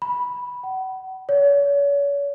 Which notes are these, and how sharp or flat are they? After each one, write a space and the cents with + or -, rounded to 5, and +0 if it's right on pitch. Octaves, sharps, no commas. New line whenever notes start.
B5 -10
F#5 +35
C#5 +40